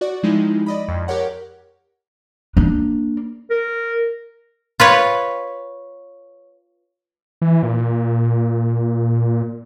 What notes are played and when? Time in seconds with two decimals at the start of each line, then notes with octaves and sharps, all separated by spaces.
0.01 F#4 D5
0.23 F3 G#3 D#4 E4 G4
0.66 D5 D#5 B5
0.88 F2
1.08 G4 A#4 C#5 F#5
2.57 A#3 D4
3.50 A#4
4.80 F4 B4 C#5
7.42 E3
7.63 A#2